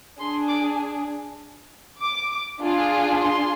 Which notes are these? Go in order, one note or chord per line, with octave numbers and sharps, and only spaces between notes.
D4 G#4 C6
D6
D6
D4 F4 G#4
C6